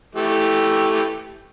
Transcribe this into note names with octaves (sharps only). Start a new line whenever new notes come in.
E3 A3 G4